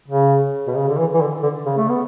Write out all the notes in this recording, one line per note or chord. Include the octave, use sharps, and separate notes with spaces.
C#3
B2
C#3
D3
E3
E3
D3
D3
C#3
A3
B3